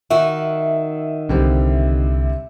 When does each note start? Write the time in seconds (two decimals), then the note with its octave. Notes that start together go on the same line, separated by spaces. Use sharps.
0.10 D#3 D#4 F#4 E5
1.29 C2 D3 G3 C4